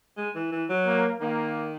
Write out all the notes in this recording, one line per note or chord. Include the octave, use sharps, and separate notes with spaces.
G#3
E3
E3
F#3
A#3
D#3 A#3